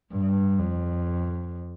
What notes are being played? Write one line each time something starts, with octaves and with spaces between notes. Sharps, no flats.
G2
F2